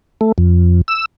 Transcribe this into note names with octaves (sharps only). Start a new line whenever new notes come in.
A3
F2
E6